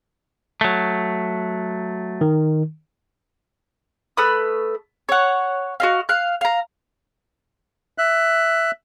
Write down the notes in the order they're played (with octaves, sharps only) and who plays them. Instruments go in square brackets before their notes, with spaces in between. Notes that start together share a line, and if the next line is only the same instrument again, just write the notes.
[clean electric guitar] F#3 A3
[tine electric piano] D#3
[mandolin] A3 B4 B5 D#6
C#5 F#5
F#4 D#5 F5
F5 F#6
F5 A#5
[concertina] E5 F#6